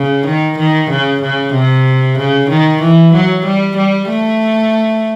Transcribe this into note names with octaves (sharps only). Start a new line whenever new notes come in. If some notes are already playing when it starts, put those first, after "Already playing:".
Already playing: C#3
D#3
D#3
C#3
C#3
C3
C#3
D#3
E3
F#3
G3
G3
A3